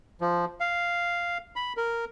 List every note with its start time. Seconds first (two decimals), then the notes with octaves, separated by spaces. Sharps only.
0.21 F3
0.60 F5
1.56 B5
1.77 A#4